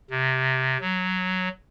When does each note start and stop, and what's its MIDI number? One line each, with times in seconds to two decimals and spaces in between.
0.10 0.77 48
0.81 1.49 54